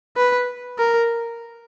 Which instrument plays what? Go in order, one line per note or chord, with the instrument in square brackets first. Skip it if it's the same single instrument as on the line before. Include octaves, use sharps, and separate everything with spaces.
[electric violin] B4
A#4